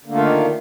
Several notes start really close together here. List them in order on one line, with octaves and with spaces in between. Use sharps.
D3 A#3 A3 F4 D#3